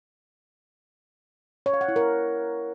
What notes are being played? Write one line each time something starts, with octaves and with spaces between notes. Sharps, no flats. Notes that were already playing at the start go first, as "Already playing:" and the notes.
C#5
F5
F#5
E4
A#4